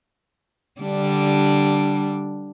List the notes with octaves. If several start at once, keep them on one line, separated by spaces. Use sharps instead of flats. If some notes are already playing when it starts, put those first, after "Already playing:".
D3 G3 D4